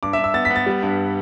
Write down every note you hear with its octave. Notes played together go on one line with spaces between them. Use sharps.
G2 D6
E5
G2
E6
B3 A6
B6
B3
A6
G3
G2